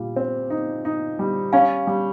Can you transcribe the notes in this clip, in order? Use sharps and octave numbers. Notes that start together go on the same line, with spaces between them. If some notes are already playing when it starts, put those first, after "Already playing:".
Already playing: A#2 G3
C4
D#4
D#4
G3
C#4 F5 G#5
G3